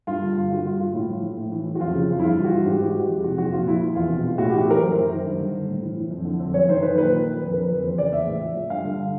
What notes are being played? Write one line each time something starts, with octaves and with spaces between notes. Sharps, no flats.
G2 F4
D3
G2
G2 F#4
D3 F4
G2 F4
A2 E4
F3
F3
A2
E3
E3
F#4
F2 F4
C#3
F2
E4
G2 F4
E3
F#4
E3
G#2 G4
E3 F#4
E3 G4
F2 G#4
C3 F#4
F2 F#4
A#2 F4
F3 E4
F3 E4
E2 F4
B2
B2
A2 F#4
G4
E3
G4
E3 A#4
F#2 C5
D#3
D#3
G2
D3
G2
A2
E3
E3
F2
D3
F2
F#2 C#5
D#3 C5
D#3 B4
A#2 B4
F3
F3
F2 B4
D3 A#4
B4
F2
E2 C5
C#3 D5
E2 E5
A2
F3
F3
G2 F5
D3